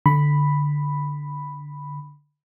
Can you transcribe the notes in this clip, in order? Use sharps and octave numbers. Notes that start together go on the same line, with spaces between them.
D3 B5